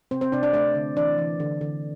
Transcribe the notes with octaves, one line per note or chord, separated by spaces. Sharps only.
C3 C4 C5
C4 C5
C3 D4 D5
D4 D5
A3 D4 D5
D3
E3 D4 D5
E3
D3
D3